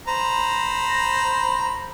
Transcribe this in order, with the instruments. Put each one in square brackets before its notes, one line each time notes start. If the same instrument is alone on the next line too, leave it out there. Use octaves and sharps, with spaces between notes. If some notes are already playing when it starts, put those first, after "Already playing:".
[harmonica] C5 A#5 B5